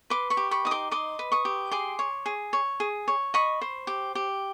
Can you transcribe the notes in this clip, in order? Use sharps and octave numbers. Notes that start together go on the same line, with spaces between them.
B4 C6 D6
B5 C#6
G4
B5 C#6
D#4 D#6
C6 D6
D#5 C6 D6
B4
C#6 D#6
G4
G#4 C6 D6
C#5
G#4
C#5
G#4
C#5
D#5 B5 C#6
C5
G4
G4